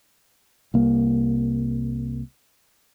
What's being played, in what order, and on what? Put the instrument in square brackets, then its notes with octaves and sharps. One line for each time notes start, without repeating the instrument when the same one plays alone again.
[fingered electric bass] C2 A#3